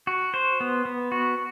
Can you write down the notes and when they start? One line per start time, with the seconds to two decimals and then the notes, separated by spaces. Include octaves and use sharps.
0.07 F#4
0.34 C5
0.60 B3
0.85 B3
1.12 F#4